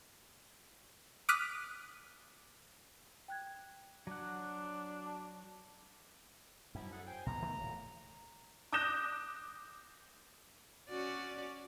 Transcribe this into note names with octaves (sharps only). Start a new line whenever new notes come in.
D6 D#6 F6 F#6 B6 D#7
G5 F#6 G#6
F#3 D4 F#5
A5
F#2 F3 G3 E4
G#4 A4 F#5
C5 G5 G#5
D#2 B2 A#5
D#3 A3 B3
D#1 A2
D6 D#6 F#6 G6 A#6 E7
C#4 F#4 D5